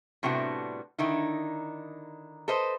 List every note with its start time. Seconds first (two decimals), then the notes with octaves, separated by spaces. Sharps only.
0.23 A2 C3 G3 B3 D4 F#4
0.99 D3 D#3 D#4 E4
2.48 A4 B4 C5 D#5